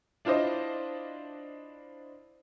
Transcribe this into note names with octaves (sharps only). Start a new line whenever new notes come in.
D4 E4 F4 C5 D#5